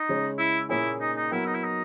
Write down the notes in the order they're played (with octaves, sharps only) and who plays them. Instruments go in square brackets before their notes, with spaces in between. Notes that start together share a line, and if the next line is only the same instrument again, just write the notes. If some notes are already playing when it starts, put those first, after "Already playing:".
Already playing: [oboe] D#4
[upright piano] C#3 G#3 C#4
[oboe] E4
[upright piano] A#2 A#3 C#4 G#4 [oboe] E4
[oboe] D#4
D#4
[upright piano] F#3 B3 F#4 A#4 [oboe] E4
[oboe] D#4
E4
D#4